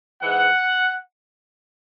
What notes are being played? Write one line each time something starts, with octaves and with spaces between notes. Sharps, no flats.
G#2 E3 G#3 F#5